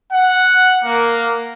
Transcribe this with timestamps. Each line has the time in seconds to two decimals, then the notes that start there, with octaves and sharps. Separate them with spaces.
0.13 F#5
0.85 A#3